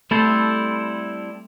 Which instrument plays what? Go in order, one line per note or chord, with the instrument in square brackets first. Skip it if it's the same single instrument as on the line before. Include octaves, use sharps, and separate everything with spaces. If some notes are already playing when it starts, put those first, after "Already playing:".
[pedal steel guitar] G3 C4 E4 A4 C5 [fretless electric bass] A3